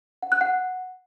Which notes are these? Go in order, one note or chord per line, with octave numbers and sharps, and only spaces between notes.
F#5
F#6
F#5